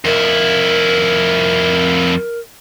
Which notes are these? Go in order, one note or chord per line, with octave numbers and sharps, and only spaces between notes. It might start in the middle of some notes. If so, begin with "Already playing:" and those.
F2 E4 A#4